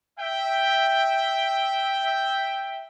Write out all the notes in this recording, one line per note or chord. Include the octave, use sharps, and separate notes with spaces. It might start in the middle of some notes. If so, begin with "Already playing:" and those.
E5 G5